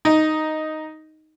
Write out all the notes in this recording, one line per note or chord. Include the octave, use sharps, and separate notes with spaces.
D#4